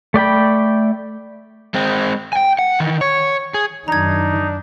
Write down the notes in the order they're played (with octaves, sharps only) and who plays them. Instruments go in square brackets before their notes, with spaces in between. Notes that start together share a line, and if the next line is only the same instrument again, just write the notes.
[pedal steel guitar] A3 D5 G5 B5
[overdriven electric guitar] G#3 C4
G5 G#5
F#5
D#3 E3
C#5
G#4
[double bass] F#2 D#3 [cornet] D4 [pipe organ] D#4 [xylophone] A#5 G#6